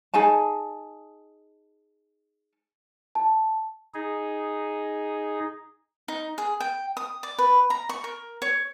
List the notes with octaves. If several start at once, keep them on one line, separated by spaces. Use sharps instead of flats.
D#4 G#4 G#5 A5
A5
D#4 G#4
D#4
G#4
G5
D#6
D5
B4
A#5
C#6
A#4
C#5